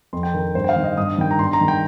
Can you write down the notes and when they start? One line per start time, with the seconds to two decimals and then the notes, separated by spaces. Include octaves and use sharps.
0.13 F2 C6
0.23 G5
0.34 D#3 A#4
0.55 G2 C5
0.64 G5
0.69 F5
0.76 D#3
0.84 D#5
0.97 G2 D#6
1.18 D#3 G5
1.31 A#5
1.39 G2 C6
1.53 A#5
1.61 D#3
1.68 G5